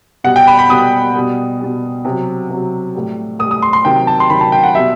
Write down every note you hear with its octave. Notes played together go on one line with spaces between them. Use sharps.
B2 G3 F#5
G5
B5
B5
B2 G3 D#6
B2 G3
B2 G3
C3 F#3
C3 F#3
A2 G3
A2 G3 D#6
D#6
C6
C6
C3 D#3 F#3 G5
A5
C6
C3 D#3 F#3 B5
A5
G5
F#5
B2 G3 E5